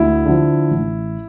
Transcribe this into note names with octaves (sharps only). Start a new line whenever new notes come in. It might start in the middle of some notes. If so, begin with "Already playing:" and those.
Already playing: D2 E4
D3 F3
A1